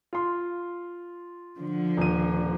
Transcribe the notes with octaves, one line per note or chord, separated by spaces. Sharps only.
F4 C6
D3 F3
D#1 D#7